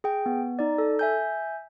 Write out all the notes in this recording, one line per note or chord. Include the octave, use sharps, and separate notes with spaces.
G#4 G5
B3
D#4 D5
A4
E5 G#5 G6